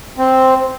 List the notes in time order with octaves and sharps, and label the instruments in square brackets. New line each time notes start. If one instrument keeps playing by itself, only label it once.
[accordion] C4